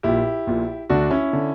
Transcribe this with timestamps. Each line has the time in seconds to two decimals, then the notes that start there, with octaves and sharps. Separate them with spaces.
0.03 A#1 A#2 E4 G4
0.47 A#1 A#2
0.90 D2 D3 D4 F#4
1.11 C#4 E4
1.33 D3